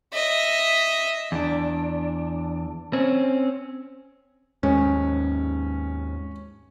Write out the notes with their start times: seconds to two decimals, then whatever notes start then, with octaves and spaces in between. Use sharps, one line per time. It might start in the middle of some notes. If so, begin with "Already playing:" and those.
0.13 D#5 E5
1.32 E2 D4
2.93 C4 C#4
4.63 D#2 G#2 G#3 C#4